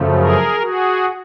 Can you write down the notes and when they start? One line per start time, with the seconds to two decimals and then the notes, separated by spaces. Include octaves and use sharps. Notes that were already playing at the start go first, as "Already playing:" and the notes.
Already playing: F#2 C#3 F3 A3
0.17 G#4 A#4
0.60 F#4 G#4